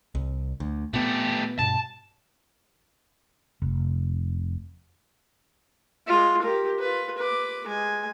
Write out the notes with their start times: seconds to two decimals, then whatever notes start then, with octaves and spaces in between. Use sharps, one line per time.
0.15 C2
0.60 D2
0.94 A#2 A3 B3 G4
1.59 G2 B2 A5
3.62 F1
6.07 G#3 F4
6.42 G4 A#4
6.79 F4 B4
7.18 B4 D6
7.67 G#3 G#5